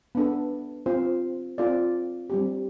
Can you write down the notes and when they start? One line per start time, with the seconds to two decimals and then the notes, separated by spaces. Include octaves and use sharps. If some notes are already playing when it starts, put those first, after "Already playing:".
0.15 B3 D4 A4
0.86 C4 F4 C5
1.58 C4 F4 A4 D5
2.30 G3 C4 G4